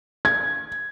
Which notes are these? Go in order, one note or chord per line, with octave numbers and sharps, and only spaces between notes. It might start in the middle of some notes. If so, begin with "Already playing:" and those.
G#6